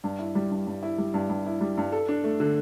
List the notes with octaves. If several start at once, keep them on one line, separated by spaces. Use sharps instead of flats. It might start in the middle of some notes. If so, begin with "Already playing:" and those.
G2
E4
G3
G2
G2
E4
G3
G2
G2
E4
G3
G2
A4
D4
A3
D3